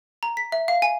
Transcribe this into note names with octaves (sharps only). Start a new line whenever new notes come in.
A#5
B6
E5
F5
G#5